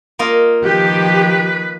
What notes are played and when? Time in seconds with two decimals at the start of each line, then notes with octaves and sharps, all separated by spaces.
0.19 A#3 F4 D#5
0.65 D#3 F3 G4 B4